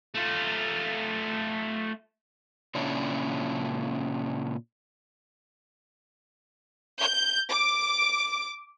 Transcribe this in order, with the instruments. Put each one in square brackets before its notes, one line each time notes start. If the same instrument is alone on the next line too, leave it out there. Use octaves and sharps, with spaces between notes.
[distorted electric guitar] A3 F4
[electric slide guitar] A#2 C#3 C#4 D4 E4
[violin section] G6
D6